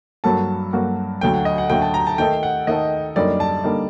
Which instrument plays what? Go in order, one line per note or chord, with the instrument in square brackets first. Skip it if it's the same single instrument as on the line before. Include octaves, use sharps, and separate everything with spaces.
[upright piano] G2 F#3 A#3 F#4 A4 [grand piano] A5
[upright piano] G2 F#3 A#3 F#4 A4
[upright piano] D2 D3 F#3 A3 [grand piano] G5
[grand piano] F#5
D#5
F#5
[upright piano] D2 D3 F#3 A3 [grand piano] G5
[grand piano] A5
A#5
A5
[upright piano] D#3 A3 D#4 A4 [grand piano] G5
[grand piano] F#5
[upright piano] D#3 A3 D#4 A4 [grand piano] D#5
[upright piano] F#2 D3 G3 A#3 D#4 [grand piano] D5
[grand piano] A5
[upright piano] D3 G3 A#3 D#4